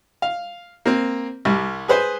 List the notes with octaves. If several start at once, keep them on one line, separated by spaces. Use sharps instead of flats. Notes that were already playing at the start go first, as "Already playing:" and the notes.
F5
A#3 C4
C2 G3
G#4 B4 C5